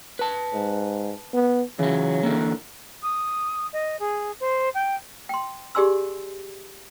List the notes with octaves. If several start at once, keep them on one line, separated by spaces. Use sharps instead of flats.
B4 A5
G#2
B3
C#3 E3 F#3
D3 E3 A#3
D#6
D#5
G#4
C5
G5
G5 C6
G4 G#4 D5 G#5 C6 E6